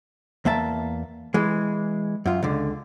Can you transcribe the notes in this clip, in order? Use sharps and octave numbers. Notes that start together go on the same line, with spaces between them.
E2 A#3 E5 A5
E3 G#3
F#2 F4
C#2 D3